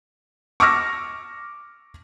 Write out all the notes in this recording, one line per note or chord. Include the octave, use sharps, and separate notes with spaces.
C#6 D6 E6 F6 A#6